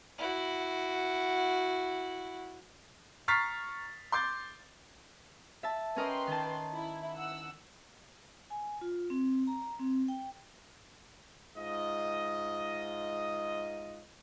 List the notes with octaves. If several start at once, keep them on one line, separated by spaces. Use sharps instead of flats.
E4 F#4
A#5 C#6 F6 A6 B6 C7
C6 D6 G6 A6
E5 A5
C#4 A#4 B4 D#5 G5 C6
D#3 A5
E4
F#5 E6
G#5
F4
C4
A#5
C4
G5
G#2 F4 D#5